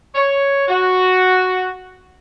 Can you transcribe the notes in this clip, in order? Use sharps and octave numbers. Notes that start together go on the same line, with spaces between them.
C#5
F#4